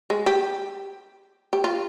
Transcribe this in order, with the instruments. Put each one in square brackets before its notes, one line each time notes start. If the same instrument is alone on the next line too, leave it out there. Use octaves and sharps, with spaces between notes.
[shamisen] G#3
G4
G4
F4